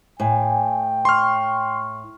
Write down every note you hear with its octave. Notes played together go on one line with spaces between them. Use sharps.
A2 G5 G#5
C6 C#6 F6